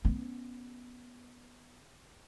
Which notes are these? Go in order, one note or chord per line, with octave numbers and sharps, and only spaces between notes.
B3 C#4